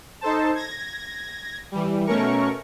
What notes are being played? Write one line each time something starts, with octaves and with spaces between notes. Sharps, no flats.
D#4 A4 C5 A5
G#6 A#6
E3 G3
B2 A3 C#4 A#4 C#6